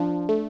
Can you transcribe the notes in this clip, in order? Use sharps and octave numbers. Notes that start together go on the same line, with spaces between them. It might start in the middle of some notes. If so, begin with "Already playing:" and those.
Already playing: F3 D4
A3